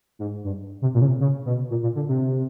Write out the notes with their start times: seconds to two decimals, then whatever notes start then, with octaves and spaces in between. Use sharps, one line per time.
0.19 G#2
0.44 G2
0.82 C3
0.94 A#2
1.01 C#3
1.07 C3
1.20 C#3
1.45 B2
1.70 A#2
1.83 A#2
1.96 D3
2.08 C3